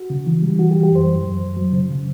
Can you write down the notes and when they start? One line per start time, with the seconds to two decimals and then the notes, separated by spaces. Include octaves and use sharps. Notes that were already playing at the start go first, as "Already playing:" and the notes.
Already playing: F#4
0.10 C#3
0.26 E3
0.42 G3
0.59 E3 F#4
0.71 G4
0.75 E3
0.83 G4
0.91 F#2 C5
1.08 F#2
1.24 F#2
1.40 F#2
1.57 F#3
1.73 C#3
1.89 C#3